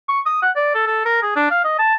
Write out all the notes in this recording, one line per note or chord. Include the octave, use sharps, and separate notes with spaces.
C#6
D#6
F#5
D5
A4
A4
A#4
G#4
D4
F5
D#5
A5